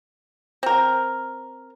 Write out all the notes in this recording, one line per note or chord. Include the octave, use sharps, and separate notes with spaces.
C4 A#4